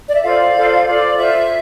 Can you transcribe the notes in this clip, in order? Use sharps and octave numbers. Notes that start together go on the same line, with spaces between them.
D5
E5
F4 A4 C5 D5 F5
F4 A4 C5
F4 A4 C5 D5
F4 A4 C5 E5